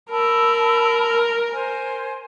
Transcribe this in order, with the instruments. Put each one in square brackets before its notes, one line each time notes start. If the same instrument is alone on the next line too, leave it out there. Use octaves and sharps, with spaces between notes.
[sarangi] A#4 [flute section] A5 B5 E6
[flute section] C5 G#5